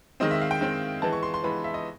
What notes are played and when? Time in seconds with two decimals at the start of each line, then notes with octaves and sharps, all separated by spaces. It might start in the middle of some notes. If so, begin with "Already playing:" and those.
0.20 D#3 G#3 C4 D#5
0.31 E5
0.42 F5
0.51 G5
0.61 D#3 G#3 C4
1.02 E3 G#3 B3 A5
1.13 C#6
1.23 C6
1.34 C6
1.44 E3 G#3 B3 B5
1.64 E5
1.74 D#5